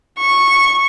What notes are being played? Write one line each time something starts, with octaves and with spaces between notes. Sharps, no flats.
C#6